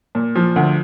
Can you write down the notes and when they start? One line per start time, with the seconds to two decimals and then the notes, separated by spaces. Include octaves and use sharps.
0.15 A#2
0.35 F3
0.56 D2